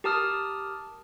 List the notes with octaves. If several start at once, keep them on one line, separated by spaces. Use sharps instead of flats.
G4 A#4 A5 D#6 F6